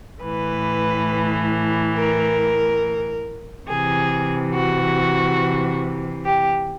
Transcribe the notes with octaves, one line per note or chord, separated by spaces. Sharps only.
A2 E3 B4
A#4
C3 E3 G#4
F#4
G4